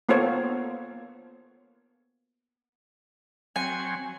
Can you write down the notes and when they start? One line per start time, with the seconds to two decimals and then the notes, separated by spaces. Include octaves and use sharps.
0.09 A#3 B3 F4 A4 C5 C#5
3.56 F#3 C4 C#5 G#5